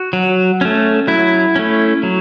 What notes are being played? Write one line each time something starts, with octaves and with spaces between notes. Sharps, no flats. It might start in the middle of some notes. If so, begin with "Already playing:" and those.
Already playing: F#4
F#3
A3 C#4
F#3 E4
A3 C#4
F#3